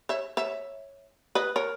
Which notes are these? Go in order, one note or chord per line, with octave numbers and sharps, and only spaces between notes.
C#5 E5
C#5 E5
B4 D#5
A#4 C#5